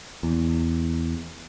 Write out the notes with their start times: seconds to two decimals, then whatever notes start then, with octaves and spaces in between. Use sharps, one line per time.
0.23 E2